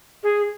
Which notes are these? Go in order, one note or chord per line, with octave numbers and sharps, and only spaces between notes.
G#4